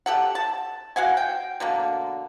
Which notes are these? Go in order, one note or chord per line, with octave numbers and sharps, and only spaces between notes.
G4 A4 F#5
A5
F#4 F5 F#5 G#5
G5
B2 D3 A#3